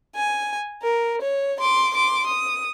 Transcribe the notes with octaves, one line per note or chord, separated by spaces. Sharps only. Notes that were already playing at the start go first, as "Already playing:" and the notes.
G#5
A#4
C#5
C6 D6
C6 D6
D#6